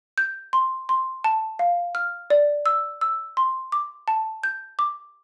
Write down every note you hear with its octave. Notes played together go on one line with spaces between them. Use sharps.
G6
C6
C6
A5
F5
F6
D5
E6
E6
C6
D6
A5
G6
D6